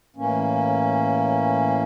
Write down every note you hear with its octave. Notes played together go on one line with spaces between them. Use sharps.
A2 E3 A#3 C#4